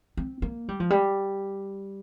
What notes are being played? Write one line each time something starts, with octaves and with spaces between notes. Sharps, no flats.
C4
A#3
G3
F3
G3